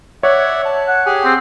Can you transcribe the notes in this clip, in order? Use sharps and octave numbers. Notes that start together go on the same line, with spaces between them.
C#5 D5 E5 F#5
A5
F#5
G4 G#4 G#5
C4